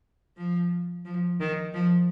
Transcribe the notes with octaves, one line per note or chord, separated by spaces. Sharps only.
F3
F3
D#3
F3